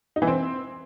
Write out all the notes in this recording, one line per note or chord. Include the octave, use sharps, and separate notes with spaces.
D#4
E3
C4